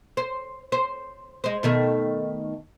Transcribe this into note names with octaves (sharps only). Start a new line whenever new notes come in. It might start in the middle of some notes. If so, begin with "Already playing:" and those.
C5
C5
G#3 C5
B2 D#3 A3